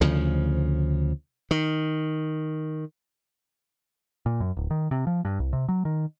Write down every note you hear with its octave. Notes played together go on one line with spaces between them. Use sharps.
D2 C#3 F3
D#3
A#2
F#2
D1
D#3
C3
F3
G2
C2
C3
F#3
D#3